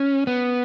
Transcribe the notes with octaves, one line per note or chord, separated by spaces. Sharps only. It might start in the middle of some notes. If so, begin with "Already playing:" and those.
Already playing: C#4
B3